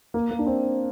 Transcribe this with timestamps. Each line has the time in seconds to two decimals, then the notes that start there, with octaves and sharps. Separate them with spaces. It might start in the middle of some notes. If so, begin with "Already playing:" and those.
0.14 A#3
0.31 A#3
0.39 D4
0.47 C4